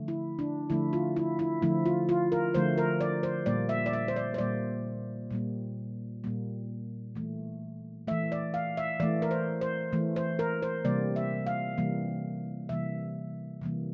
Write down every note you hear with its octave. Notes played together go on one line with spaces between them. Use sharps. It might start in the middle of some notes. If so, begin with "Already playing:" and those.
Already playing: D3 F3 A3
E4
D4
D3 F3 A3 E4
F4
E4
E4
D3 F3 A3 E4
F4
F4
A#4
D3 F3 A3 C5
A#4
D5
C5
A#2 G3 A#3 D5
E5
D5
E5
C5
D5
C5
A#2 G3 A#3 D5
A#2 G3 A#3
A#2 G3 A#3
E3 A3
E3 A3 E5
D5
F5
E5
E3 A3 D5
A#4
C5
C5
E3 A3
C5
A#4
C5
C3 E3 G3 A#3 D5
E5
F5
C3 E3 G3 A#3
C3 E3 G3 A#3 E5
C3 E3 G3 A#3